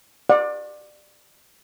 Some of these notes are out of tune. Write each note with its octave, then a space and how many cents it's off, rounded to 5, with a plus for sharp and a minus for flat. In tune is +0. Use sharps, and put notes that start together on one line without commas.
D5 +25 F#5 -35